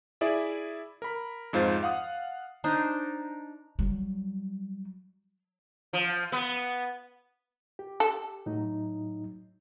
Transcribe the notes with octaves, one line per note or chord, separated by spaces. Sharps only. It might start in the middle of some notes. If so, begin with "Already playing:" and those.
E4 G#4 D5 E5
A#4 B5
F2 G#2 F4 C5 A6
F5 F#5 D#6
D4 D#4 C5
F#3 G3
F3
B3
G4
A4
A2 F#3 D#4